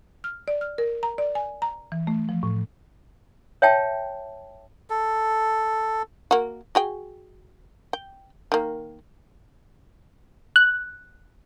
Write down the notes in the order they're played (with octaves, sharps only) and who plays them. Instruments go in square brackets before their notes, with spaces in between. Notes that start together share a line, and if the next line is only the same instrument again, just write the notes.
[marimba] F6
D5
F6
A#4
A#5
D5
G#5
A#5
E3
A3
F3
A2
[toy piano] C#5 E5 G5 A5
[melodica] A4
[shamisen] A#3 F#4
F#4 G#4 G5
G5
D#3 A#3
[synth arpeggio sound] F#6